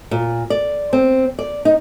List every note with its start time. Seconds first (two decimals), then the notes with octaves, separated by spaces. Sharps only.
0.11 A#2
0.50 D5
0.93 C4
1.39 D5
1.65 D#4